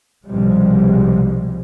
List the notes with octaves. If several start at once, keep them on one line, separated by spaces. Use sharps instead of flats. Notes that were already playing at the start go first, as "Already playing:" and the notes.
C2 B2 F3 G3 G#3